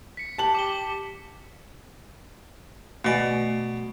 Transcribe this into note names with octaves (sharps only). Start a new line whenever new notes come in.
B6 C#7
G4 A5 F#7
D6 G7
B2 A3 D5 D#5 G#5